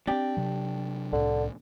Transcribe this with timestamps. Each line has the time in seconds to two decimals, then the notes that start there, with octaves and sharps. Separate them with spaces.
0.07 B3 C4 D4 G4
0.37 C3 F#3
1.13 C2 A2 D3